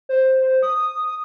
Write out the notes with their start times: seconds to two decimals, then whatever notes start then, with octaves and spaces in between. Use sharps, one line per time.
0.09 C5
0.63 D#6